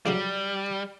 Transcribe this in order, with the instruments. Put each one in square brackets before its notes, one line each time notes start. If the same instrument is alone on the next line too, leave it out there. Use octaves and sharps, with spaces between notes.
[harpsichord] A2 C#3 F#3 [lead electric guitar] G3